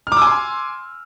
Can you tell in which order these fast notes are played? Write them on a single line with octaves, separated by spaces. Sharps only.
F6 D6 E6 G#5 C6